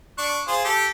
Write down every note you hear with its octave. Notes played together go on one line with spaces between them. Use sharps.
D4 C#6
F4 G#4 C5
G4 A4